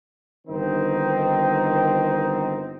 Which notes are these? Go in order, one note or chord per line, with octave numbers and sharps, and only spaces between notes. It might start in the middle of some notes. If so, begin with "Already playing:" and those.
G1 D#3 C4 D#4